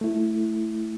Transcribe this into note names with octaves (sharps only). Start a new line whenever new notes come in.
A3 E4